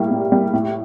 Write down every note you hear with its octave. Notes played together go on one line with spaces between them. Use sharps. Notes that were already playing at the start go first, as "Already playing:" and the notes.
Already playing: A2 G3 A#3
A2
G3 A#3
A2